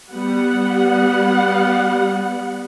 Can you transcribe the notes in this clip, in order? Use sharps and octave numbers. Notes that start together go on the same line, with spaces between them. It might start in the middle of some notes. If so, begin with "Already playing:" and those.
G3 B3 F#5